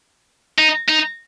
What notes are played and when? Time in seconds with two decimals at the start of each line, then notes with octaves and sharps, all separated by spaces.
0.58 D#4
0.89 D#4